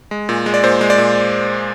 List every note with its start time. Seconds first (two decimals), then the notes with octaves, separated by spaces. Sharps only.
0.11 G#3
0.29 A#2
0.46 G#3
0.54 D5
0.64 A#2 C5
0.81 G#3
0.90 D5
0.98 A#2